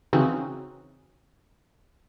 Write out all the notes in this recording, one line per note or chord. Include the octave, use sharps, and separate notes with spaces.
C#3 E3 C4 C#4 D#4 F#4